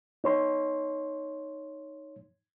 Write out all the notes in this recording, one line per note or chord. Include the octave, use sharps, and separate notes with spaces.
D#4 C#5 C6